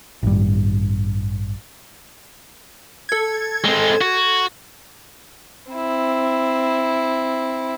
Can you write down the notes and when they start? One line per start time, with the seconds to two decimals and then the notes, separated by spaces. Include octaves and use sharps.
0.23 A1 G2
3.09 A4 G#6
3.65 G#3 C4
4.01 F#4
5.71 C4 E4